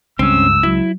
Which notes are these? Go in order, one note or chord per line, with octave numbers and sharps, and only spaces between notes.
C#2 G2 C4 C#4 E6
F#3 E4